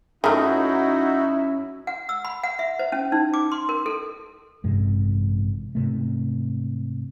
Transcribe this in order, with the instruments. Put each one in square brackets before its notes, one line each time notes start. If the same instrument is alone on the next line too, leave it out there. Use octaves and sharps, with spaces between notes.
[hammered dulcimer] F#2 [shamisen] D#3 A3 [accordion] D#4 F#4 [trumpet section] E4
[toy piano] F#5
E6
B5
F#5
E5
C5
C#4
D#4
D6
C6
A#4
A4
[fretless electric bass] A1 G2 C3 G#3
G#2 C3 A3